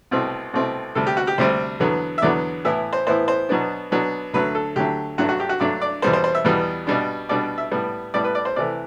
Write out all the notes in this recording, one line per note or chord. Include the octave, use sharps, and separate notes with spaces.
C2 B2 A3 C4
C2 B2 A3 C4
D2 C3 G3 A4
G4
F#4
G4
D2 C3 G3 C5
E2 D3 F#3 B3
E5
E2 D3 F#3 B3 D5
A2 E3 B3 E4 E5
C5
A2 E3 B3 E4 C5
C5
B2 F#3 B3 D4
B2 F#3 B3 D4
D2 D3 F#3 A3 B4
A4
D2 D3 F#3 A3 G4
G2 F#3 A3 D4 F#4
F#4
G4
F#4
G2 F#3 A3 D4 D5
D5
E2 B2 G3 B3 C5
C5
C5
E5
E2 B2 G3 B3
B2 G3 D4
B2 G3 D4 D5
E5
A2 G3 B3
A2 G3 B3 D5
B4
D5
C5
C3 E3 A3 D5